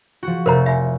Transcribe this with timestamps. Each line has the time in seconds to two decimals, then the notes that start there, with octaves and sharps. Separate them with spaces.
0.23 F3 F#4
0.46 F1 A#4 C5 A#5
0.66 E5 G#5